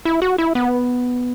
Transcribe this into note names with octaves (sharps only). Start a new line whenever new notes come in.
E4
F#4
E4
B3